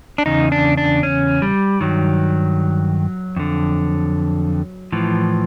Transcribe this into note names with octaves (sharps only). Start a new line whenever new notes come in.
D4
E2 C#3 D#4
D4
D4
C#4
G3
G2 D#3 F#3
F2 D3
A2 E3 F3